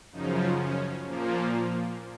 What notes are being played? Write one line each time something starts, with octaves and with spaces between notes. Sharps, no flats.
F#2 C#3 F3 D#4
C#4
A#2 F3 A#3